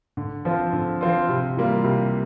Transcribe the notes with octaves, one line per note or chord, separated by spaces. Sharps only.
D3
F3 C4 F4
D3
F3 C4 F4
C3
E3 G3 A#3 F4
C3